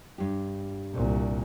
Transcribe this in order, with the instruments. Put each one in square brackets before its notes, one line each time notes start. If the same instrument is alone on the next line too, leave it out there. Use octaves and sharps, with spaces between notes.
[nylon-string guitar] G2 G4
[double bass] C2 A#2